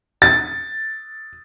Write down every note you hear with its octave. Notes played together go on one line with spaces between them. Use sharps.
A6